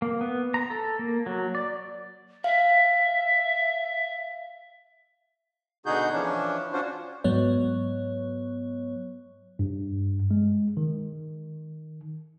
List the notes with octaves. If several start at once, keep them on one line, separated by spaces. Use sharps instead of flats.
A#3
B3
A#5
A4
A#3
F#3
D5
E5 F5
B2 D3 D#4 F#4 G#4 G6
E3 F3 C#4 D4
C#4 D4 F4 F#4 C5
G#2 F#3 B3 C#5
G2
G#3
D#3